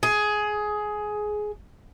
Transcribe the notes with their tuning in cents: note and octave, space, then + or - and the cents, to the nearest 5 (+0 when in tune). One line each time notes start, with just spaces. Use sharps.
G#4 +15